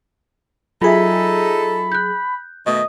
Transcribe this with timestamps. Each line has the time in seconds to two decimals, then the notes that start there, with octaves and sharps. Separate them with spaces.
0.82 F#3 D#4 F4 G#4 A4 E5 B5
1.92 F#6 G6
2.66 B2 D#3 A3 D#5